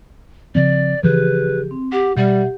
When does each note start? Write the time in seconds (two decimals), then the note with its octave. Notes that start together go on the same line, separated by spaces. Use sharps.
0.55 C#3 F3 C4 D5
1.03 C#3 E3 F3 G4 G#4 B4
1.71 C4
1.92 G4 F#5
2.17 B2 G3 G4 E5 F#5